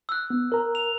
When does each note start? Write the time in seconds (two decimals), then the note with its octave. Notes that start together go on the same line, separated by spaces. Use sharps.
0.09 E6 F#6
0.30 B3
0.52 A#4 A#5
0.75 F7